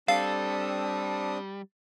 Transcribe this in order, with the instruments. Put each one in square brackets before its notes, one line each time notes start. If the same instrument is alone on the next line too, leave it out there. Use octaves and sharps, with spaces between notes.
[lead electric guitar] G3 [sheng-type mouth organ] C4 D4 D#6 [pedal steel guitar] A4 [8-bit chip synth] F5